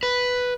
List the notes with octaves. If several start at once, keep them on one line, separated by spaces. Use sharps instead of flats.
B4